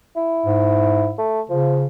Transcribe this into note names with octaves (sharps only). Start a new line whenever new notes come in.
E4
G#2
A3
C#3 F3